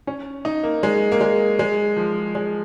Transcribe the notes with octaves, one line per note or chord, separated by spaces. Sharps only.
C#4
D#4
A#3
G#3
A#3
G#3
G#3
F3
G#3